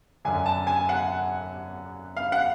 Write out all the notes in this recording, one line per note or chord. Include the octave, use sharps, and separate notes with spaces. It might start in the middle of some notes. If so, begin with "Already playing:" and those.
F#2 D3 G#5
A5
G#5
F#5
F5
F#5